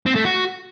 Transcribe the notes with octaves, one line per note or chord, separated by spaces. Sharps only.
C4
A3
F#4